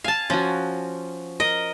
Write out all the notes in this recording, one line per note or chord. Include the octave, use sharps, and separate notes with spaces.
F5 G#5 A5
F3 C#4 F#4
A#4 D#5